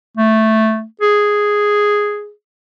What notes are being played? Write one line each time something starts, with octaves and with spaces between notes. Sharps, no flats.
A3
G#4